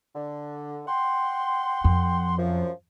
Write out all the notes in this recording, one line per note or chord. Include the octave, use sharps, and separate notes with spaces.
D3
F#5 G5 C6
F2
F#2 F3